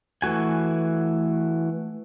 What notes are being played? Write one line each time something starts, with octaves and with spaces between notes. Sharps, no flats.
E3 A3 F#4 G#5